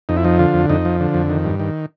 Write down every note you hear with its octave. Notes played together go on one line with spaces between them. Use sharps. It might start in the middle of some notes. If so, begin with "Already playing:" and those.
F2 D#4
E4
F3 D#4
D3 F4
F2
F2 D#4
F3
D3
F2
D#3
G2
D#3